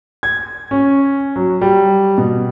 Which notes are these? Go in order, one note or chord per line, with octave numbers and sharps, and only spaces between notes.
G#6
C#4
F#3
G3
B2